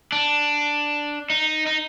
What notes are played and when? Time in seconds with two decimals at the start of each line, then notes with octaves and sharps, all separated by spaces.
0.12 D4
1.30 D#4
1.67 D#4